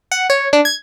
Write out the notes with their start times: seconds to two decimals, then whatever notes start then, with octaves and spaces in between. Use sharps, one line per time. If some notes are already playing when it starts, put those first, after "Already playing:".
0.12 F#5
0.30 C#5
0.53 D4
0.65 G#6